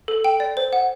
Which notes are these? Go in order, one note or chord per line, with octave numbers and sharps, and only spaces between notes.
A4
G5
D5
C5
F#5